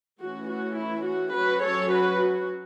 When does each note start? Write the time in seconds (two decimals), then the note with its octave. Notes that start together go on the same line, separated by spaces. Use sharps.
0.21 E3 A3 C#4 F#4
0.49 F#4
0.78 E4
1.07 F#4
1.35 F#3 C#4 F#4 B4
1.64 A4 C#5
1.93 F#4 B4
2.22 F#4